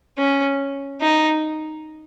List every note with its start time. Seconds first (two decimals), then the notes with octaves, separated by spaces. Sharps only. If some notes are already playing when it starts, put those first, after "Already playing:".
0.18 C#4
1.01 D#4